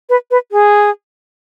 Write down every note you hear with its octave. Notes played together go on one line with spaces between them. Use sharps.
B4
B4
G#4